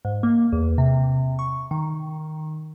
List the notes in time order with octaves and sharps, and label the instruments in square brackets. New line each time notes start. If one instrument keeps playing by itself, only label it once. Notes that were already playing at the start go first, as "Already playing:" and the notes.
[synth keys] G#2
A#3
E2
C3
C#6
D#3